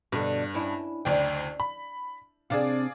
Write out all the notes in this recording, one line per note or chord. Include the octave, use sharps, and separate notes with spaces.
G2 B2 D3
C#4 D4 E4
F#1 D2 D5 G5
B5
C3 D4 G#4 D5 F5